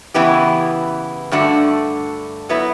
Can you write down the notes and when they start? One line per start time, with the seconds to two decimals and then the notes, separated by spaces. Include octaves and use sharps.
0.14 C#3 E3 B3 E4 G4
1.32 G2 D3 A3 D4 F#4
2.49 F#3 B3 E4 B4